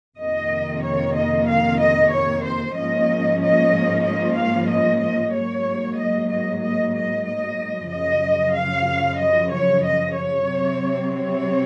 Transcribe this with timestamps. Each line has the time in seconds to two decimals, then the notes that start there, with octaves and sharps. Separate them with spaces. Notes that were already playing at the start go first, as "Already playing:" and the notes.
0.19 F2 C3 D#3 A#3 D#5
0.84 C#5
1.16 D#5
1.48 F5
1.80 D#5
2.12 C#5
2.45 C5
2.77 G#2 F3 A#3 C#4 D#5
3.41 D#5
4.06 D#5
4.38 F5
4.70 D#5
5.02 D#5
5.34 G#2 F#3 A#3 C#5
5.99 D#5
6.31 D#5
6.62 D#5
6.95 D#5
7.27 D#5
7.91 F#2 C#3 F3 D#5
8.56 F5
9.20 D#5
9.52 C#5
9.85 D#5
10.16 C#5
10.48 C3 F#3 C4
11.13 C#5